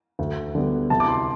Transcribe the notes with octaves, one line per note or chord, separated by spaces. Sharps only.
D2
D3 G3 B3
C2 A5
D6
C6